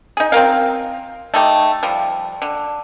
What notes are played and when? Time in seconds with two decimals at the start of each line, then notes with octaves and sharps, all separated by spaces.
0.17 D#4 G#4
0.32 C4 F4 A#4 F5
1.34 A3 D#4 G4
1.83 F3 G3
2.42 D3